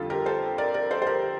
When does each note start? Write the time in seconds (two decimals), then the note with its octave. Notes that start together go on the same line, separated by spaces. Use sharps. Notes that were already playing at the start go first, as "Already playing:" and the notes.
Already playing: F2 D3 G3 F4 A4
0.10 G4 A#4
0.26 A4 C5
0.58 A#4 D5
0.74 A#4 D5
0.91 A4 C5
1.02 C5
1.07 G4 A#4